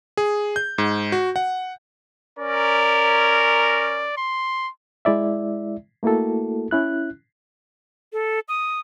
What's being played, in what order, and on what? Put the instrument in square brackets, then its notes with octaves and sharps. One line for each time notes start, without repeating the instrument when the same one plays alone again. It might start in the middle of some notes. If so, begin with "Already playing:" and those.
[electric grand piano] G#4
G6
G#2
F#4
F#5
[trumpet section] C#4 A#4 [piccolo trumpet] D5
[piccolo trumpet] C6
[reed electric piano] G#3 E4 D5 E5
A3 A#3 E4 F#4 A4
C#4 E4 F#6
[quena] A4
D#6